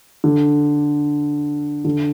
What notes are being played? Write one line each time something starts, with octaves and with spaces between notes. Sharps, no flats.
D3
D3